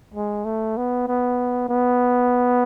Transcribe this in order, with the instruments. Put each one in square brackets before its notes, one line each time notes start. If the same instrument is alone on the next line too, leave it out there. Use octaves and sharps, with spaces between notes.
[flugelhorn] G#3
A3
B3
B3
B3